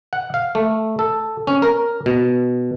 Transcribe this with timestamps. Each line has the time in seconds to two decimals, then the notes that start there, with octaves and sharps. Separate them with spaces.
0.13 F#5
0.34 F5
0.55 A3
0.99 A4
1.47 C#4
1.62 A#4
2.06 B2